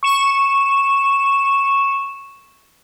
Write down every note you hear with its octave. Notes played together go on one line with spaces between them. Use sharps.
C#6 E7